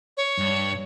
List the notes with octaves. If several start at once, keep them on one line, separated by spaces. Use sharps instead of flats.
C#5
G2